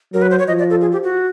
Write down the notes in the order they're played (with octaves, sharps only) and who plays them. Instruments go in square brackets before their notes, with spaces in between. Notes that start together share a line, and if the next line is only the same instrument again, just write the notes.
[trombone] F#3 [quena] A#4
[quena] B4
C5
C#5
[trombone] F3 [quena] D#5
[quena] D5
A4
G#4
G4
F#4